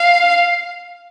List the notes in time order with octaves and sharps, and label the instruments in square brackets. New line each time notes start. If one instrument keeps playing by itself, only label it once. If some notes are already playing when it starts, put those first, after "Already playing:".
Already playing: [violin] F5